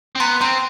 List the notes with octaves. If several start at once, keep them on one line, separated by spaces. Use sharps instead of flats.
C4
B3 A#5 C6
C4 A#5 C6